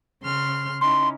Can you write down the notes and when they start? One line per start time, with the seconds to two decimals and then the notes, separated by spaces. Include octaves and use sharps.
0.23 C#3 C6 F6
0.81 C#4 D#4 E4 C6